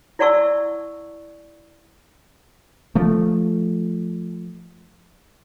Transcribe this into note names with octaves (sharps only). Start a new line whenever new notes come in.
E4 D5 F#5 A5 C#6 E6
F3 A3